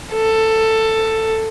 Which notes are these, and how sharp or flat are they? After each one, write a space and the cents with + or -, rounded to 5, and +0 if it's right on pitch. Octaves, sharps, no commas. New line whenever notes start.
A4 +10